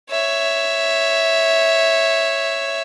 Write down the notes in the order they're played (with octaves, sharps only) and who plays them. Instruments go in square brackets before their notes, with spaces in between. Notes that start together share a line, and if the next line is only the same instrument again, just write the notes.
[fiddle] C#5 E5